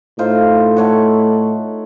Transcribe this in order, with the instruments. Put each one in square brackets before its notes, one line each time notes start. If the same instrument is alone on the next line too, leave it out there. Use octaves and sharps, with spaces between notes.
[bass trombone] A2 [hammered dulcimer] D#4 F4 C5
[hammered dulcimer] A3 C#5 F#5